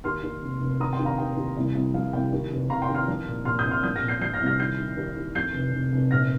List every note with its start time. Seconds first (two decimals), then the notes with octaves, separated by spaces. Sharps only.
0.04 D#2 C6 F6
0.23 D#2
0.43 F1
0.61 F1
0.80 D#3 A#5 D#6
0.93 G5 C6
0.99 D#3
1.05 F5 A#5
1.18 D#2 G5
1.37 D#2
1.57 C2
1.75 C2
1.94 F3 F5
2.13 C2 G5
2.32 D#2
2.50 F1
2.69 F1 F5 A#5
2.82 G5 C6
2.89 D#3
2.94 C6 F6
3.08 F3
3.27 A#2
3.45 A#2 C6 F6
3.59 D#6 G6
3.65 A#1
3.70 C6 F6
3.83 F3 D#6 G6
3.96 F6 A#6
4.02 A#2
4.08 G6 C7
4.21 F3 G6 C7
4.34 F6 A#6
4.40 C2
4.46 F6 A#6
4.59 D#3 G6 C7
4.78 D#3
4.97 D#2
5.16 D#3
5.35 F2 G6 C7
5.54 F1
5.73 F1
5.92 F1
6.11 A#1 F6 A#6